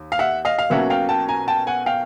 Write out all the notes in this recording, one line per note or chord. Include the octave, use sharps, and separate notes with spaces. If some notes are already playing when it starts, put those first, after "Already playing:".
Already playing: D#2
F5
E5 F#5
D#5 F5
F5
B1 B2 F#3 A#3 C#4 E5 F#5
F5 G5
G5 A5
G#5 A#5
G5 A5
F#5 G#5
F5 G5